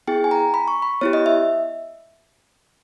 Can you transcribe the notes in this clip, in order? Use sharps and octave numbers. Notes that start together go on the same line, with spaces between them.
B3 E4 G#4 G5
G#5
A#5
B5
C#6
B5
B3 E4 G4 C#5
D#5
E5